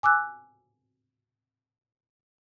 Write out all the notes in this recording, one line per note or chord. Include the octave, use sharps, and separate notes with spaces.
G#5 D6 E6 F#6